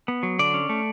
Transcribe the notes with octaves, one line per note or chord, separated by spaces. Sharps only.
B3
F#3
D3 D5
C#4
A3